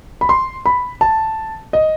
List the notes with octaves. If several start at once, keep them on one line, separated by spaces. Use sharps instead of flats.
B5
C6
B5
A5
D#5